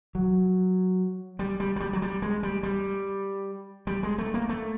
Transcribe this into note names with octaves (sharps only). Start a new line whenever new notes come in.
F#3
G3
G3
F#3
G3
F#3
G3
G#3
G3
G3
G3
G#3
A3
A#3
A3